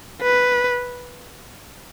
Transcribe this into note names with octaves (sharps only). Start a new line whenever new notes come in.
B4